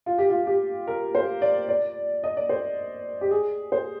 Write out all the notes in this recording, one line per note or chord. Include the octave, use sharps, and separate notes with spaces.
F4
G4
F4
G4
A#4
C5
D5
D5
D#5
D5
C5
G4
G#4
C5